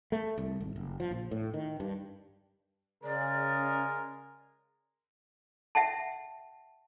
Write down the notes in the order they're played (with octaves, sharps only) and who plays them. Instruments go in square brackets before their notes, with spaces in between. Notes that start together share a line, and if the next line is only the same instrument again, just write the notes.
[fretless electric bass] A3
C2
G#1
F#1
F3
A#1
A2
D#3
G2
[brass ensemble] C#3 [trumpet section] G#3 G#4 A#4 [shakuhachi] D5
[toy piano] E5 F#5 G5 A5